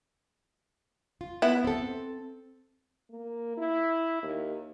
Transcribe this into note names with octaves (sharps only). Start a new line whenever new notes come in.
F4
B3 E4
C4 A4
A#3
E4
D#2